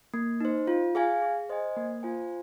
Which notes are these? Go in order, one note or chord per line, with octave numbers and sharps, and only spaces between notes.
A#3
D#4 C5
F4
G#4 F5 G#5
G#4
C5 D#5 G#5
A#3
F4 C5 G#5